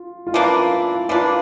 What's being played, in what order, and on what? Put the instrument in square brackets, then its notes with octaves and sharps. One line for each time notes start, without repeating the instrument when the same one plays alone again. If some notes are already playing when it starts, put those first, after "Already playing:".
Already playing: [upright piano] F4
F4
[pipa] E3 A#3 D4 [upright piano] E4
[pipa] E3 A#3 D4 [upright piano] F4